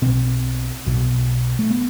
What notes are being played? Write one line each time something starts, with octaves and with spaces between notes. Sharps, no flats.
B1 B2 C4
B1 B2
A3
B3